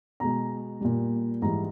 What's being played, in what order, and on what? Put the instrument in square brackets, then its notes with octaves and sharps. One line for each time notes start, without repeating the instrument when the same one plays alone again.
[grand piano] B2 G#3 A#5
A#2 G3
G#2 E3 G3 A#5